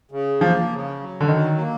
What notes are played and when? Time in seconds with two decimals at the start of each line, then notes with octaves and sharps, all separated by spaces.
0.11 C#3
0.40 F3 A#3
0.71 C#3
1.00 F#3
1.21 D3
1.28 D#3 F#3
1.58 A#3